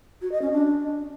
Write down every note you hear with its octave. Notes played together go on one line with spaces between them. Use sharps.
F#4
D#5
C#4
D4